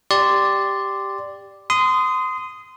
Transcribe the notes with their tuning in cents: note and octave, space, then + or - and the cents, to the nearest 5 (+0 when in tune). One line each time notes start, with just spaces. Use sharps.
G4 +0 D5 +0 C6 -10
C6 -25 D#6 +0